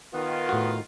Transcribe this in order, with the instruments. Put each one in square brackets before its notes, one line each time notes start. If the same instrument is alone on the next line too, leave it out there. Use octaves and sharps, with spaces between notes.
[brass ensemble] D#3 F4 [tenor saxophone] B3
[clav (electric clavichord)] A2 F#4